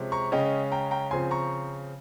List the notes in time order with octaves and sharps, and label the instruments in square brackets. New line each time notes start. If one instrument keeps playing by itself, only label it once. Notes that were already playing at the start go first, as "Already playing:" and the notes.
Already playing: [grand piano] C3 F3 G#3 C#4
A#5 C#6
C#3 G#3 C#4 D#5 G5
G5 A#5
G5 A#5
C#3 F3 C4 G#5 C6
A#5 C#6